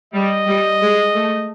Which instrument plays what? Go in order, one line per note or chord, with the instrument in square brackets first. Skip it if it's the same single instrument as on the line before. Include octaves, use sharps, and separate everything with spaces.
[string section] G3 [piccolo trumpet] D#5
[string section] G3
G#3
A3